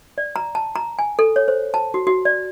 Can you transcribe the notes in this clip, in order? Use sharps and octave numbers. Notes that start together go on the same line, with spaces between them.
D5
A#5
A5
A#5
G#5
A4
C#5
C5
A5
F#4
F#4
D5